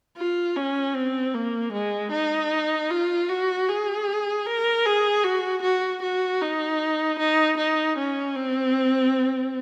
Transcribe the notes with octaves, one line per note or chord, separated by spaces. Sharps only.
F4
C#4
C4
A#3
G#3
D#4
F4
F#4
G#4
A#4
G#4
F#4
F#4
F#4
D#4
D#4
D#4
C#4
C4